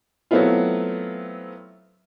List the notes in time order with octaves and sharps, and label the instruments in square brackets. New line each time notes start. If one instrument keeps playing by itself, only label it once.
[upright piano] F#3 A3 B3 C4 E4 F4